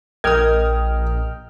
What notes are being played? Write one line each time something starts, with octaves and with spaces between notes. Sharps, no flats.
A#1 A#4 D#5 G5 D#6 F6 G#6